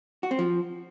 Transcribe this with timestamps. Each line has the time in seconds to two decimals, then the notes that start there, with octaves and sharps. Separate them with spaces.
0.23 F#4
0.31 C4
0.39 F3